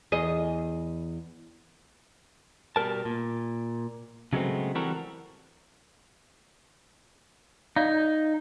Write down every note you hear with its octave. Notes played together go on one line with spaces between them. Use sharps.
E2 G#4 D#5
B2 G3 A#4 A5
A#2
C#3 F#3 G#3 A3 B3 C4
E3 G3 C4 F#4 A4 A#4
D#4 D5 F5